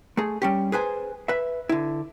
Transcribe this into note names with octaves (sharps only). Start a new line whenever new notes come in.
A3 G#4
G3 C#4 G4
G#4 B4 C5 G#5
B4 E5
D3 E4